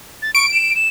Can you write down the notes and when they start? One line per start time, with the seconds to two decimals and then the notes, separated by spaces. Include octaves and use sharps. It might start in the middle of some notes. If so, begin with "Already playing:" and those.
0.22 A6
0.35 C#6 D7
0.52 E7
0.75 E7